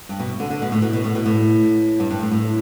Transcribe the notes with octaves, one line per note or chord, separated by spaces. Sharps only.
G2
B2
D3
D3
B2
A2
B2
B2
A2
B2
A2
G2
G2
A2
A2